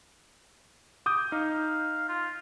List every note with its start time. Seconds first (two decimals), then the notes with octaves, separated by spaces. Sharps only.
1.06 D6 D#6 G6
1.32 D#4 F5
2.09 F4